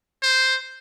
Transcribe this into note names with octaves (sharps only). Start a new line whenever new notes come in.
C5